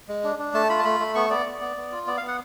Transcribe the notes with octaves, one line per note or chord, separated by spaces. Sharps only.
G#3
D4
D4
A3 A5
F4 B5
A5
A3 B5
A3
B3 C#6
B3 D5
B3
B3
B3
F4
B3 D5
F5
B3
F#5